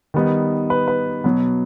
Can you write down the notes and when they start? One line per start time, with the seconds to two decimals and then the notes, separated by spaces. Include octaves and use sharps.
0.14 D#3 G3 B3 D#4
0.70 B4
0.88 B4
1.24 B2 F#3 B3